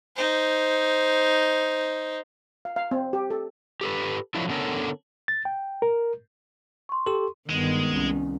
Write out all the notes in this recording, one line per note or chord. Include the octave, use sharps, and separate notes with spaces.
D#4 C5
F5
F5
C4
G4
A4
G4 A4 B4
F3 F#3 A3 D4 E4
D3 B3 C#4 D4 A4 A#4
A6
G5
A#4
C6 C#6
G4 A4
G1 D#3 G#3 B3
C2 C#4